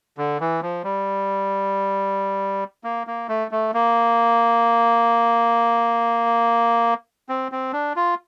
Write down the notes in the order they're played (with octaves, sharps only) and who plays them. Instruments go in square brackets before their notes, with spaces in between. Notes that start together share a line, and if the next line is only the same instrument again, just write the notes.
[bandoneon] D3
E3
F3
G3
A#3
A#3
A3
A3
A#3
C4
C4
D4
F4